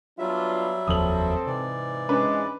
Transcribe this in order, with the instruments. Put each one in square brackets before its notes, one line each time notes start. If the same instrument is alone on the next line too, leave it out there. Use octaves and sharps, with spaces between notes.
[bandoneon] F#3 G3 E5 [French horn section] B3 D4 F4
[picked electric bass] F1 D#2 F3 [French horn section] C4 A4 [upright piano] D#6 F#7
[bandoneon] G#2 E3 D5 [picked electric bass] C3
[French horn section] G#3 [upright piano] C#4 D4 B4